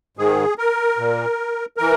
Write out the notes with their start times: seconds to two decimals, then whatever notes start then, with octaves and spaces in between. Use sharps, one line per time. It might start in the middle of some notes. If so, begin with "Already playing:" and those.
0.17 G#2 D#3 G#4
0.58 A#4
0.98 A#2
1.77 E3 A#4